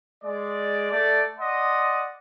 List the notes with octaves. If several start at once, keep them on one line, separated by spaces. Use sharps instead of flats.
G#3 D5
A3 D5
D5 D#5 F#5 C6